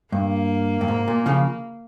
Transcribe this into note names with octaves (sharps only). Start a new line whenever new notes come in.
G2 A#3
G2
G#2
A#2
C#3 F3